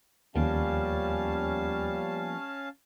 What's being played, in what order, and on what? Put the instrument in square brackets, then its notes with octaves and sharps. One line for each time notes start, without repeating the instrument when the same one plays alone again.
[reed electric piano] D#2 [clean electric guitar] F3 A#3 B3 [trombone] G3 [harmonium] C#4 F5 A5